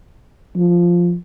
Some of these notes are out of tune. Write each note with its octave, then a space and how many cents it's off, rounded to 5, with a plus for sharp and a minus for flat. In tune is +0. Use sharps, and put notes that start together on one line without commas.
F3 +0